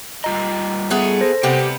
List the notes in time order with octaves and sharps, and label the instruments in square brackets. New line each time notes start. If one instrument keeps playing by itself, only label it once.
[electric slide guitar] G3 F4 D#5 [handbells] A#5
[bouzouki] A3 B3 G#4
[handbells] A4 C5 A#6
[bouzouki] C3 G3 B3 [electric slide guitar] G4